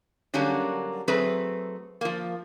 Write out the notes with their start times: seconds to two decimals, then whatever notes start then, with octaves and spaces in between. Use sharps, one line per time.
0.34 D3 F#3 G3 A#3 C#4 D4
1.08 F#3 A3 C4 G#4 B4
2.01 F3 A#3